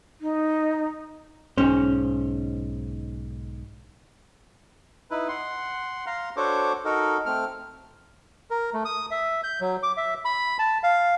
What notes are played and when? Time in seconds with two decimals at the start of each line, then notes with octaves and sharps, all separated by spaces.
0.21 D#4
1.58 B1 G#2 C#4 C5
5.11 D#4 E4 B4
5.28 F#5 C6
6.06 F5 A#5 C6
6.37 D4 F#4 A4 C5 C#5 D6
6.85 D#4 F#4 A4 A#4
7.26 A3 C4 F6
8.50 A#4
8.74 A3
8.85 D#6
9.11 E5
9.44 G6
9.61 F#3
9.83 D6
9.97 E5
10.25 B5
10.59 A5
10.83 F5